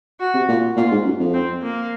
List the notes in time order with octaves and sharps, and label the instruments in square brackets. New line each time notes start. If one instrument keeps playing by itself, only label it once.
[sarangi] F#4
[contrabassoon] C3
A#2
[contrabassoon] A#2 [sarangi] F4
[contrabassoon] G#2
F#2
F2
[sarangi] C4
A#3